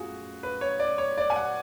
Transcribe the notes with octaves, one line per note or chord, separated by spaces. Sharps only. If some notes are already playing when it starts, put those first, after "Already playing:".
Already playing: F#2 A3 F4 F#4 G#4
B4
C#5
D5
C#5
D5
G#5
F#5